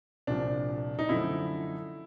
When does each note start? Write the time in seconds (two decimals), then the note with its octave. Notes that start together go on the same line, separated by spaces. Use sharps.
0.27 C2 A#2 F3 D4
0.99 D#4
1.09 F#2 D3 F3 A3 E4